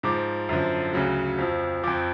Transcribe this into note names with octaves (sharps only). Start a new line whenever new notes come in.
G#2 F3 D6
F#2 D3 F3
D2 C#3 F#3
F2 F3
F2 F3 D6